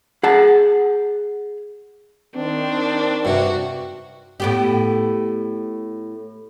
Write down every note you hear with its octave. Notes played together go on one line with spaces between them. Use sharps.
G#4 F#5 A5
D#3 C4 D4
G2 C3 F#4
A2 B3 G4